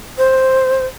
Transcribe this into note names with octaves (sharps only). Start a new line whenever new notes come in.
C5